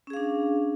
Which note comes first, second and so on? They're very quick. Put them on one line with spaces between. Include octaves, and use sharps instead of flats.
C#4 G#4 F5 D4